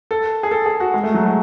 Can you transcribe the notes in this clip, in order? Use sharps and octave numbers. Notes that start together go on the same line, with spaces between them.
A4
G#4
A4
G#4
F#4
G#3
A3
F#3
G#3